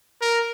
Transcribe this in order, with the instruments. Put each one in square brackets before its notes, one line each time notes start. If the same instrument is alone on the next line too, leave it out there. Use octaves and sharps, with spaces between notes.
[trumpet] A#4